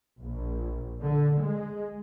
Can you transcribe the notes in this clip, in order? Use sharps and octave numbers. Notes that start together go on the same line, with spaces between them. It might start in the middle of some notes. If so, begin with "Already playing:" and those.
A#1
D3
G#3